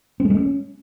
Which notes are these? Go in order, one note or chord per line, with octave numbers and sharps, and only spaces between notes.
C4
A3
G#3
A3
C#4